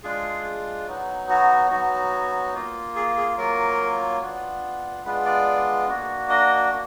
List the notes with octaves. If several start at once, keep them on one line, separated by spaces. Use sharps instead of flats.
G#3 D4 F4 G#4
F#3 B3 D#4
F#4
F#3 B3 D#4 F#4
A#3 F4
G#4
G#4
F#3 A#3 F4 A#4
B3 D4 F4
G#3 B3 D4 F4 B4
D5
A#3 D4 F#4
D#5
A#3